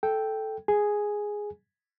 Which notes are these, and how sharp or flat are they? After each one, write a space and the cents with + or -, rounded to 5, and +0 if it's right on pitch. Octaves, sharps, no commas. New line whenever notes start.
A4 -10 G5 +0
G#4 +0 G#5 +0